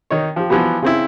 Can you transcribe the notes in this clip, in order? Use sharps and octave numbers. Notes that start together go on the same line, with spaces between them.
D#3 D#4 C#5
F3 G4
E3 F3 G3 B3 F#4
C#3 C4 E4